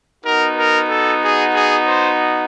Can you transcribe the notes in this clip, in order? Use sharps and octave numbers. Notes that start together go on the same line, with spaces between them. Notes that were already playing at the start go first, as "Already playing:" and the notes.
B3 D#4 F#4 A#4
A#4
A4
G#4
G#4
C5